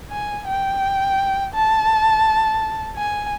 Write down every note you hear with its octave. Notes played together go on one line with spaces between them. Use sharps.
G#5
G5
A5
G#5